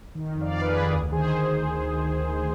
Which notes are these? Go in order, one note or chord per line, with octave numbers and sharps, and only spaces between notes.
D#3
F2
D5 F5
D#3
B4
G#4
F2
D2 G#4
D#3 G#4 C5